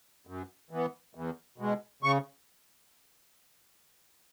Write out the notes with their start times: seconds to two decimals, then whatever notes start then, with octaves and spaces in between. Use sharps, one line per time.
0.27 F#2
0.71 E3 B3
1.15 E2
1.58 B2 G#3
2.03 C#3 C#6